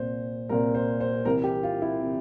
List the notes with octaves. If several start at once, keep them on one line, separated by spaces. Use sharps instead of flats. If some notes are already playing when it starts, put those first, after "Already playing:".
Already playing: C2 A#2 C5
C2 A#2 A#4
C5
C5
C2 C3 E3 A#4
G4
F4
E4
C3 E3